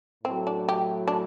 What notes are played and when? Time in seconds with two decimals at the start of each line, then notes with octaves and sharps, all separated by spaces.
0.24 A2 F#3 A3 C4
0.47 D4
0.69 G4
1.08 D4